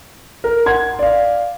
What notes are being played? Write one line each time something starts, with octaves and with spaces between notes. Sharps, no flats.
A#4
F#5 C6 G#6
D5 F5